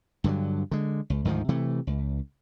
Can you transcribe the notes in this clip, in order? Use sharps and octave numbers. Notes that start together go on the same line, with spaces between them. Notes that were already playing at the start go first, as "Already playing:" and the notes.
G2 D3 D#3 F#3
D3 G#3
C#2
D2 G#2 D#3 F3
C3 E3 A3
C#2